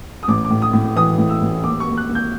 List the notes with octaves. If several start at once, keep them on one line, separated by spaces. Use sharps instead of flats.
D#6
A1 D6
D6
A2
D#6
A2
E3 D#6
A2
E6
A1
D#2 D6
C#6
D#2
F#6
D#2
G6